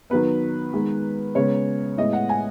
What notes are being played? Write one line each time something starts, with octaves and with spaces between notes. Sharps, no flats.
D#3 F#3 B3 B4
D#3 G#3 B3
C#3 G#3 B3 C#5
A2 G#3 B3 D#5
F#5
G#5